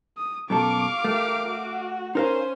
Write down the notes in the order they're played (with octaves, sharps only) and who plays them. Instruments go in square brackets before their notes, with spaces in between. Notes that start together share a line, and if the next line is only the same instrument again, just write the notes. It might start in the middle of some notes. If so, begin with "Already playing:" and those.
[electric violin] D#6
[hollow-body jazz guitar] F#2 B2 A4 [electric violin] F5 D6 [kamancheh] C#6
[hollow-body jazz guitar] A3 [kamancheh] G4 A#4
[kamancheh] F#4
[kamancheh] C#4 C6 [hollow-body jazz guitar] D#4 A#4 F5 [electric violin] C5